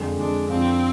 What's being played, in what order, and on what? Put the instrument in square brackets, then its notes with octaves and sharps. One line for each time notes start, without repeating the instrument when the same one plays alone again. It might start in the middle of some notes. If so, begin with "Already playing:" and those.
Already playing: [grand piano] F2 D3 G#3
[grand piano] F2 D3 G#3 [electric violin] D4
[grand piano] F2 D3 F3 [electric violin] C4